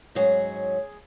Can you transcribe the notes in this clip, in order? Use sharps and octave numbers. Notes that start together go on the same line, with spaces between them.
G#2 F#3 C#4 G#4